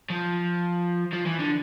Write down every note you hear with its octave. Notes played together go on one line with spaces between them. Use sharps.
F3
F3
E3
D3